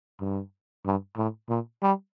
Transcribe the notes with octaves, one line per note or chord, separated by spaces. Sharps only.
G2
G2
A2
A#2
G3